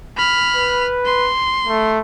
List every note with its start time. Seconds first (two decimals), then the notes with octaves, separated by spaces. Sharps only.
0.17 B5 F6
0.56 B4
1.05 C6
1.67 A3